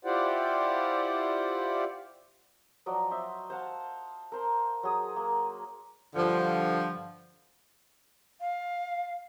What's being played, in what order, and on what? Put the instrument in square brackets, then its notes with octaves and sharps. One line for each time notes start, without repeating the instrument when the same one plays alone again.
[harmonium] E4 F4 G4 C5 D5 F#5
[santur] F3 F#3 D5 D#5
C5 D#5 E5
C5 F5 F#5 A5
A#4 C5 C6
F#3 G#4 D#6
A#3
[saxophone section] G2 D3 F3
[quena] F5